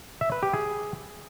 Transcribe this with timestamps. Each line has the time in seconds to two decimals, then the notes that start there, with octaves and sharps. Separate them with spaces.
0.21 E5
0.32 B4
0.43 G4
0.53 G#4